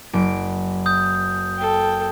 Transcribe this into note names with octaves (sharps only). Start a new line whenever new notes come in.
F#1 D7
D#6 G6
A4 G5